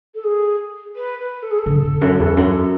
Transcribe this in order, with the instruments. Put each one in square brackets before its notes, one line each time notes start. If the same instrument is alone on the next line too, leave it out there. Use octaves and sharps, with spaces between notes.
[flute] A4
G#4
B4
B4
A4
G#4
A4
[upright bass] D3
E2
F#2
E2
F#2